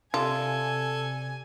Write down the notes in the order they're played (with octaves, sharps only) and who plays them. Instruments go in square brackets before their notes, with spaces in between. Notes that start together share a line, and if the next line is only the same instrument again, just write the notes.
[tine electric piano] C3 D5 D6 [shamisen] F4 [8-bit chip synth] A4 [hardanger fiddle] G#5